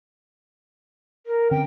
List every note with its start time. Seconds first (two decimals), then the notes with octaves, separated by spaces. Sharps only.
1.26 A#4
1.51 D3 C4 C#4 G5